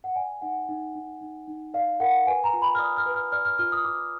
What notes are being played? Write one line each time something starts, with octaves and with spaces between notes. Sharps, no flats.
F#5
D5 G#5
D#4 F#5
D#4
D#4
D#4
D#4
D5 F5
A#4 F#5
B4 G#5
A#5
F4
B5
F6
D5 D#6
F6
B4
F6
D5 F6
F6
F4 F6
D#6
F4 D6